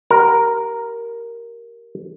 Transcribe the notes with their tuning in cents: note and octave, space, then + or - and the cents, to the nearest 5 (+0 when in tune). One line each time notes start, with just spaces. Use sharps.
G4 -20 A#4 +0 F#5 -20